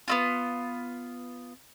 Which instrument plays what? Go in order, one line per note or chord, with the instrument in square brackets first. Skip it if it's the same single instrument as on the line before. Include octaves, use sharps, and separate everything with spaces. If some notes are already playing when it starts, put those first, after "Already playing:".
[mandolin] B3 C4 F4